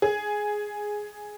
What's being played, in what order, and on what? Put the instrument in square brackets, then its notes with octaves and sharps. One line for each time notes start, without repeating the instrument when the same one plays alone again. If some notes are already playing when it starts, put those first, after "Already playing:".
[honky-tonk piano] G#4